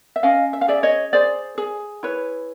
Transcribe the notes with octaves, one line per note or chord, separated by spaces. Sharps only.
E5
C#4 D#5 F5
E5
F5
G#4 D5 E5
C#5 D#5
G#4 C5 D5
G#4
E4 B4 C#5